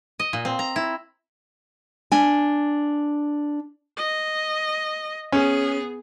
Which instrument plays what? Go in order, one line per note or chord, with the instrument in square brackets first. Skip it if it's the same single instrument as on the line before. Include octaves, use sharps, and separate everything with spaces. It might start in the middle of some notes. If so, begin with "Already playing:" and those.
[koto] D#5
A#2
C4
A#5
E4
[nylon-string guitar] D4 G#5
[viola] D#5
[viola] B3 G#4 [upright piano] C#4